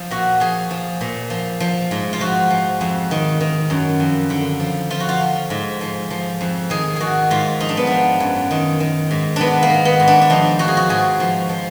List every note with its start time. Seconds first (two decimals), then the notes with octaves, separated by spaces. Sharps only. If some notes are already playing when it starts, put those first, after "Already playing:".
Already playing: F3
0.11 A#2 F#4
0.40 F3 G#4
0.71 F3
1.01 A#2
1.30 F3
1.60 F3
1.91 G#2
2.13 F4
2.20 F3 F#4
2.50 F3
2.81 F2
3.11 D#3
3.40 D#3
3.70 F#2
4.00 F2
4.30 D3
4.60 F3
4.91 F3 F4
5.00 F#4
5.09 F4
5.21 F3
5.50 G#2
5.81 F3
6.10 F3
6.41 F2
6.70 D#3 G#4
6.96 D#3 F#4 G#4
7.30 G#2 F4
7.60 F3 D#4
7.69 D4
7.77 B3
7.87 F3 D4
8.20 F#2
8.51 D#3
8.80 D#3
9.11 G#2
9.36 D#3 B3 D4
9.63 A#3
9.70 D#3
9.85 B3
10.00 G#2
10.08 D4
10.21 D4
10.30 F3 D#4
10.59 F3 F#4
10.68 G#4
10.77 F#4
10.89 G#2 G#4
11.20 F3
11.49 F3